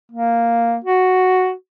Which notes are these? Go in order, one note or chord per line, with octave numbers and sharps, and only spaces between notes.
A#3
F#4